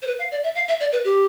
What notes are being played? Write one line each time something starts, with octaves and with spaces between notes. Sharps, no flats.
C5
B4
F5
D5
E5
F5
E5
D5
B4
G4